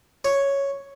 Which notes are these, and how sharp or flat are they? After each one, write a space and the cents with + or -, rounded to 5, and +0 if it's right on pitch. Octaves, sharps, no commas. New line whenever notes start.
C#5 +0